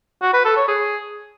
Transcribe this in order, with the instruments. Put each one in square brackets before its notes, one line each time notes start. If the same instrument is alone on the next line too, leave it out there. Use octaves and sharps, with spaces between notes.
[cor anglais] F#4
B4
A4
C#5
G#4